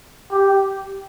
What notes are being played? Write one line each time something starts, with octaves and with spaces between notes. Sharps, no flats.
G4